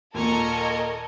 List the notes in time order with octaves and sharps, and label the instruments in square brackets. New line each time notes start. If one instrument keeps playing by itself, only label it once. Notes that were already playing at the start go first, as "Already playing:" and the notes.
[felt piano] D#2 A#2 [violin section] A4 A#4 D#5 [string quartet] G#5 A#5 C#6